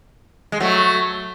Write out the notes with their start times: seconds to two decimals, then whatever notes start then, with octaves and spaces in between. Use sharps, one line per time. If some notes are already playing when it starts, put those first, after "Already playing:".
0.52 G#3
0.60 F#3 A3